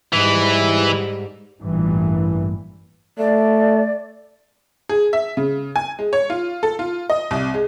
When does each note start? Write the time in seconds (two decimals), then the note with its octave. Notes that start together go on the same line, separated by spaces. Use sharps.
0.13 G#2 E3 G3
1.61 A1 G2 A#2 E3
3.18 A3 D5
4.89 G#4
5.13 E5
5.37 C#3
5.76 G#5
5.99 G#3
6.13 C#5
6.30 F4
6.63 A4
6.79 F4
7.10 D#5
7.31 C2
7.54 G#3